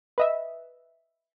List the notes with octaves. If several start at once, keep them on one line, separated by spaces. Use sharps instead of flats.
B4 D#5 E5